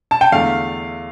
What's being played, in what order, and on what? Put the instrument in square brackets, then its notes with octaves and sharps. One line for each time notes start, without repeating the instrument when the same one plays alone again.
[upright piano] A5
G5
E2 D3 A3 F5